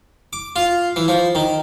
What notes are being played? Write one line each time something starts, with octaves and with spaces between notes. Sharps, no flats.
D6
F4
E3
F3
D#3